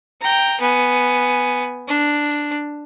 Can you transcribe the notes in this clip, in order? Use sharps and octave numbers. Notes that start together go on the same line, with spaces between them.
G5 A#5
B3 G#5
D4